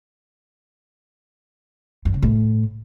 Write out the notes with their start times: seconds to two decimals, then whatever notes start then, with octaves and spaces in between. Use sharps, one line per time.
2.05 F#2
2.14 C#3
2.22 A2